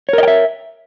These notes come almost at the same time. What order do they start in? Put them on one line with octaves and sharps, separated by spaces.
C#5 A#4 D#5 G5 E5